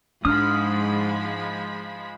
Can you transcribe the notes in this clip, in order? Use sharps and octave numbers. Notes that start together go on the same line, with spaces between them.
G#2 F3 G#3 D4 B5 D#6 F6